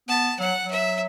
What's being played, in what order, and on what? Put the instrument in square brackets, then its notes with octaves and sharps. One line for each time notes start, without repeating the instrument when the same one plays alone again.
[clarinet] B3 [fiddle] A5
[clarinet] F#3 [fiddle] F#5
[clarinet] F#3
[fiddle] E5